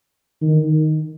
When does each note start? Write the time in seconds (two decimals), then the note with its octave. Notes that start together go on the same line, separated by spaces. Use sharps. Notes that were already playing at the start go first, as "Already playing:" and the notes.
0.42 D#3